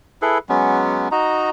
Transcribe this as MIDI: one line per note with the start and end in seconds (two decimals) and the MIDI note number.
0.22 0.38 64
0.22 0.38 68
0.22 0.38 69
0.22 0.38 71
0.49 1.08 54
0.49 1.08 56
0.49 1.08 59
0.49 1.08 61
1.11 1.50 63
1.11 1.50 66
1.11 1.50 75
1.11 1.50 82